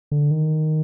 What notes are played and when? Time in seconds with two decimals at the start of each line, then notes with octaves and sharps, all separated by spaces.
0.11 D3
0.31 D#3